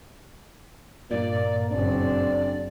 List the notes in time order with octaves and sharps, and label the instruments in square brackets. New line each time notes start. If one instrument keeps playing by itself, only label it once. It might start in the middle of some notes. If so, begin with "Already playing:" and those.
[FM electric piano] G2 A#2 [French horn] A#3 [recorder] D5
[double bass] F#1 C4 [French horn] D4 [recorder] D5